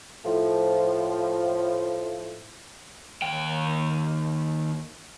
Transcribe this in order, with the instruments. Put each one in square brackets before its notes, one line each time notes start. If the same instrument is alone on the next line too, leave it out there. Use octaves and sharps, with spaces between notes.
[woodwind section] A2 F3
[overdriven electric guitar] D#2 G5